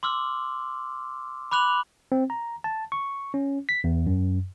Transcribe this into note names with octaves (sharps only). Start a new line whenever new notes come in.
C6 D6 E6 F6
B5 D6 F#6 F7 F#7
C4
A#5
A5
C#6
C#4
B6
E2
F#2